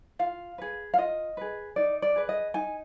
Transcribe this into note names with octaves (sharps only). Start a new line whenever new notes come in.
F4 F5
G#4 B4
F5
F4 D#5
G#4 B4
D#4 D5
D5
G#4 B4
D#5
D#4 G#5